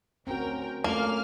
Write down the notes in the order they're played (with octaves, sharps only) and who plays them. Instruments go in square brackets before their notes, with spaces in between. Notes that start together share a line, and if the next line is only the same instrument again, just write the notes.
[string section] D2 A#4 G5 [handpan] C4 C#4 F#4
[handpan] A3 C#4 F4 [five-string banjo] A#3 [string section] F5 F6